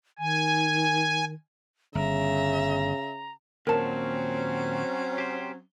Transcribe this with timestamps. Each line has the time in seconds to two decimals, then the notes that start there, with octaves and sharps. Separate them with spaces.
0.19 D#3 G#5
1.95 G1 C#3 E5 A#5
3.67 D#2 A#2 F#3 C4 C#4 A#4 A5
5.18 G4 C5